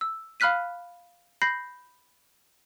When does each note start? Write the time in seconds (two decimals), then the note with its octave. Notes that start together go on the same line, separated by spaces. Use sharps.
0.01 E6
0.40 F5 B5 F6 F#6 B6 D#7
1.42 B5 G6 A#6 C7